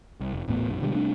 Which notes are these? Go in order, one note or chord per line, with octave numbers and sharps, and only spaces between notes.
C2
F1
D#1 A1 A2 B3
A#1 F#2
B2 D3 G3 G#3
C3 G3 A3 D4